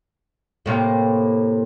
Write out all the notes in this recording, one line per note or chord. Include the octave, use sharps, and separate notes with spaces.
A2 C3 A#3